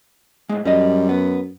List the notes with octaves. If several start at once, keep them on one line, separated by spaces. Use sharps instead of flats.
A2 G#3
F#2 G3 D#5
B3